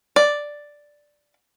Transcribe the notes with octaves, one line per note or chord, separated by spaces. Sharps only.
D5